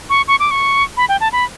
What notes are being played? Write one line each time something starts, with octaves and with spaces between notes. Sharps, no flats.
C#6
C#6
D6
C#6
B5
G5
A5
B5